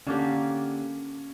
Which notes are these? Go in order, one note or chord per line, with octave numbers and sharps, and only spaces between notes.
D3 A#3 C#4 D4 G4